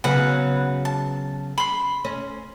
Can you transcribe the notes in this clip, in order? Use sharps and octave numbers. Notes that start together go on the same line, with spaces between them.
C#3 F#3 B3 B4 F#5
A5
B5 C6
C#4